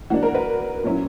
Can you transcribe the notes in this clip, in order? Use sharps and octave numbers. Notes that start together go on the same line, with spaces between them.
E3 A#3 D4 F#4
A#4
B4
A#2 F#3 C#4 E4